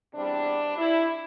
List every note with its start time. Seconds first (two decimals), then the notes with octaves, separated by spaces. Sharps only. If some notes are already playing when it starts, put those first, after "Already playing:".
0.13 E2 C3 G3 D4
0.77 E4